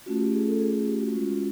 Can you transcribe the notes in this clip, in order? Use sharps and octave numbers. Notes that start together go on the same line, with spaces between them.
A3 C#4 F4 F#4
G4
G#4
A4
G#4
G#4
G4
F#4
G#3 C#4 F4